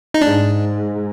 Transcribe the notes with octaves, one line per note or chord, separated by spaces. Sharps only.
D#4
G#2 D4